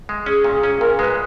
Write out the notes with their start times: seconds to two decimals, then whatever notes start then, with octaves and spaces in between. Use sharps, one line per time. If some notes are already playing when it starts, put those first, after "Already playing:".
0.09 G#3
0.26 C#4 G#4
0.44 A#2
0.53 G#4
0.63 C#4
0.81 A#2 A#4
0.99 G#3 B4